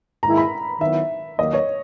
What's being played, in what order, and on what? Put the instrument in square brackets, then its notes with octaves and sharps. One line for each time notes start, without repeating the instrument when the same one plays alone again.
[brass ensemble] G#2 D#3 A#3 E4 G#4 [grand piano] A#5
[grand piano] B5
[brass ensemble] D#3 F#3 B3 E4 [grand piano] E5
[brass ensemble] D#2 D#3 F#3 A#3 [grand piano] D#5
[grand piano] C#5